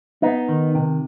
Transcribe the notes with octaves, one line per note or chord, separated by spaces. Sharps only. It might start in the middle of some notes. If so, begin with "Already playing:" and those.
B3 D#4
D#3
C3